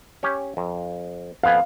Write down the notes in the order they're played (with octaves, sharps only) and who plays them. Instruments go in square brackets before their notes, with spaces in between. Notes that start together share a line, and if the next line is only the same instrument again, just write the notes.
[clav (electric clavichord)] C#4 G4 C#5
F2
[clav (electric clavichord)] F2 B3 G#5 [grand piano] F5